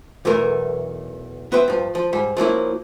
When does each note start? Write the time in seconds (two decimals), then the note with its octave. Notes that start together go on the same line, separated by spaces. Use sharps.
0.25 B1 E2 E3 A3 A#4
1.52 B3 B4 C5 E5 G5
1.68 G2 F3
1.95 F3
2.13 G#2 G3
2.37 F3 F#3 A#3 E4